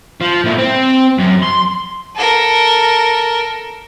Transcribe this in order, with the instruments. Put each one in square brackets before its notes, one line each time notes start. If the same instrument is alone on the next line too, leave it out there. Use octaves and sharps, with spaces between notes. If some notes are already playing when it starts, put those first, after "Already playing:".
[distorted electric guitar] F3
A#2 E4
C4
F#2
C6
[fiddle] A4 A#4